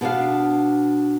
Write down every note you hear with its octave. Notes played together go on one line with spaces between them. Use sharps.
B2 B3 D4 F5